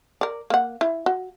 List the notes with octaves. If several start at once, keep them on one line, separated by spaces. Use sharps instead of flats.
A#4 D5
A#3 F#5
E4
F#4